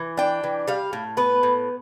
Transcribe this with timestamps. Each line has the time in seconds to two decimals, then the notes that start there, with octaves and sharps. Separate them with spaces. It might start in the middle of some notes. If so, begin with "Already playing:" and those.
Already playing: E3
0.17 D4 G5
0.44 E3
0.67 G3 F5
0.93 A2
1.17 B3 B4
1.43 A2